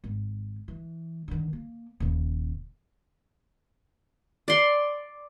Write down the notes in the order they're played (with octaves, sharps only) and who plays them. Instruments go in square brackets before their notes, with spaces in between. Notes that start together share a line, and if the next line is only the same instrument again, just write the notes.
[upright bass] G#1
E3
D3 D#3
A#3
D#1 C#3
[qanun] D5 C6